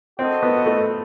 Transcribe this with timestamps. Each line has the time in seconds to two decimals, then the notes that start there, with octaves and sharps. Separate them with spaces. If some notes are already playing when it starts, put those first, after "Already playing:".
0.19 C4 F#4 A4 D#5
0.43 B3
0.66 A3